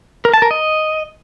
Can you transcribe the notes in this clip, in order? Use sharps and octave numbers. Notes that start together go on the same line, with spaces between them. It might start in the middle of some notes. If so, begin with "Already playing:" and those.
A#4
A5
A#4
D#5